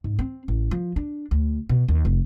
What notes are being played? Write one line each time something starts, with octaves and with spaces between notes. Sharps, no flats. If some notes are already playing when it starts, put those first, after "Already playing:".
G#2
C4
A1
F3
D4
D2
B2
D#2
F1